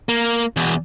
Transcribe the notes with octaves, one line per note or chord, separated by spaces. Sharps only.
A#3
E2 B2